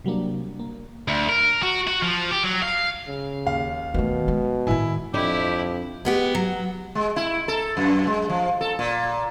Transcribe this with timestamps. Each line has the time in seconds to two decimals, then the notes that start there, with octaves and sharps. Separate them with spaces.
0.04 C3 F#3 G3 A#3 D4
0.59 A#3
1.08 D2
1.29 A#4
1.63 F#4
1.87 F#4
2.03 F3
2.31 G4
2.43 F#3
2.62 F5
3.07 C#3
3.46 D#2 F5
3.94 B2 D#3 A3
4.28 G#3
4.67 A2 D#3 E4 G#5
5.14 F2 D4 E4 G4 D#5
6.05 G#3 B3 G4
6.35 F#3
6.95 G#3
7.16 E4
7.48 A4
7.77 F#2
8.07 G#3
8.29 F3
8.61 A4
8.79 A#2